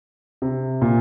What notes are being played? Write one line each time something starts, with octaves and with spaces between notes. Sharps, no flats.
C3
A#2